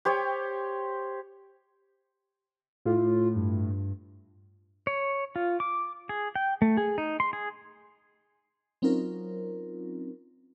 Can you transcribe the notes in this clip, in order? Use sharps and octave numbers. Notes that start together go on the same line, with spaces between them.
G4 C5 C#5 G5
A2 F4
G2
C#5
F4
D6
G#4
G5
A3
G#4
D#4
C6
G#4
F#3 C4 C#4 D#4 F4 A#4